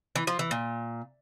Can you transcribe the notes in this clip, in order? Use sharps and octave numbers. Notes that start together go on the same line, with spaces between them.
E3
F3
E3
A#2